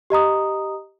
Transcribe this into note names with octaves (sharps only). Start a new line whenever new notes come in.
G4 D#5 A#5 D#6